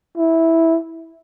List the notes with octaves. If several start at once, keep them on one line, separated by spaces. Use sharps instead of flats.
E4